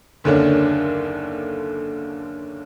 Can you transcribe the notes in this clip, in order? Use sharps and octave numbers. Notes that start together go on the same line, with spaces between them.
F#1 D#2 D3 C#4 D4